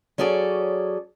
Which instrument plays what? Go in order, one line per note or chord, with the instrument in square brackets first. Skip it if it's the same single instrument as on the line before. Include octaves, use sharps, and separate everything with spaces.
[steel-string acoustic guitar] F#3 C#4 G#4 A4 D5